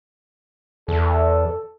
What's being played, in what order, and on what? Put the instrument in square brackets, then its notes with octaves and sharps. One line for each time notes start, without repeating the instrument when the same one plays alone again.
[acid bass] E2 [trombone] A4